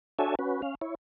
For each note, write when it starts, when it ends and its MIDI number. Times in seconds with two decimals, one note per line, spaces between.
0.19 0.35 62
0.19 0.35 66
0.19 0.35 69
0.19 0.35 73
0.19 0.35 76
0.19 0.35 80
0.39 0.62 61
0.39 0.62 66
0.39 0.62 71
0.62 0.75 61
0.62 0.75 77
0.81 0.95 64
0.81 0.95 73